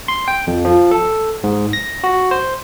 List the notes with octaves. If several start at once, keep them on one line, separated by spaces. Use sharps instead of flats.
C6
G5
F2
F3
A4
G#2
A#6
F#4
C5